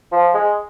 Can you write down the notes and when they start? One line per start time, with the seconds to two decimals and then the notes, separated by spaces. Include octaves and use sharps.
0.12 F3
0.34 G#3